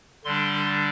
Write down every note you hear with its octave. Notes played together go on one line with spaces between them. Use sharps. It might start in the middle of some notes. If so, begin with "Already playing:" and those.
D3 G3 D4 C6